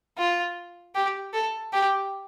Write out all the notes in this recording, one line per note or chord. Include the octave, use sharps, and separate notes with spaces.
F4
G4
A4
G4